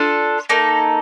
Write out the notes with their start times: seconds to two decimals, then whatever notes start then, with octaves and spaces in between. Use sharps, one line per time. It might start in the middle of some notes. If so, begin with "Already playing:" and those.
Already playing: D4 F4 A4
0.49 A#3 D#4 A4